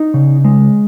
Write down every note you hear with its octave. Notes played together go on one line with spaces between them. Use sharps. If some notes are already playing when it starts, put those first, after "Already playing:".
Already playing: D#4
C#3
G#3